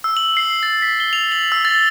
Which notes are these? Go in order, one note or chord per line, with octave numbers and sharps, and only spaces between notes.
E6
F#7
C7
A6
B6
G7
F7
F#7
E6
A6